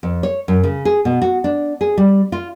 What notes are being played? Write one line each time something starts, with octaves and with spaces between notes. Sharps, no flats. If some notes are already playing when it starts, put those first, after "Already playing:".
F2
C#5
F#2
C#3
G#4
B2
F#4
D4
G#4
G3
F4